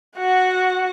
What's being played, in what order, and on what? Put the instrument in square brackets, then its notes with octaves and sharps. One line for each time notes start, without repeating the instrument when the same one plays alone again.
[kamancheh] F#4 F#5